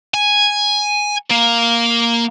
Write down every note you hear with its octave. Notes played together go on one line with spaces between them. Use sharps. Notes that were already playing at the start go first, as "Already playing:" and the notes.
G#5
A#3